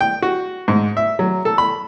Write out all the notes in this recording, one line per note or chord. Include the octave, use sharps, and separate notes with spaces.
G5
F#4
G#2
E5
F#3
A4
B5